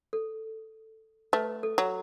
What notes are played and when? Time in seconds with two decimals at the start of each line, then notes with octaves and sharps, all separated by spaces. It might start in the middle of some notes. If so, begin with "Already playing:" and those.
0.13 A4
1.33 A3 B4
1.63 A4
1.78 F#3